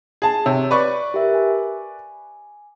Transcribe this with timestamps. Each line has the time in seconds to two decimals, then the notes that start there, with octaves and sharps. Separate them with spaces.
0.22 G#4 A5
0.46 C3 C#5
0.71 B4 D5 C#6
1.14 G4 A#4 E5
1.34 G#5